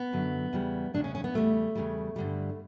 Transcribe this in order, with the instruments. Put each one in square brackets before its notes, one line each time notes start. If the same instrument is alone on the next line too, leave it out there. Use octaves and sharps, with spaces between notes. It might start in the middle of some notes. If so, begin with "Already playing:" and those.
Already playing: [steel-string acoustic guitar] B3
F#2 D3 F#3
E2 C#3 G3
E2 C#3 G3 D4
C#4
C#4
B3
E2 C#3 G3 A3
E2 C#3 G3
G2 D3 G3